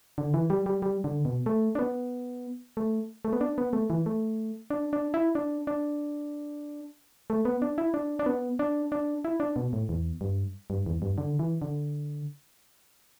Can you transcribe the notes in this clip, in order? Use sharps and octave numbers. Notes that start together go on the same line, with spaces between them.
D3
E3
G3
G3
G3
D3
B2
A3
D4
B3
A3
A3
B3
D4
B3
A3
E3
A3
D4
D4
E4
D4
D4
A3
B3
D4
E4
D4
D4
B3
D4
D4
E4
D4
B2
A2
E2
G2
G2
E2
G2
D3
E3
D3